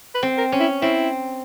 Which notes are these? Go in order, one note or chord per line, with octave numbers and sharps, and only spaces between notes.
B4
C4
A#4
C#4
E4
C4 E4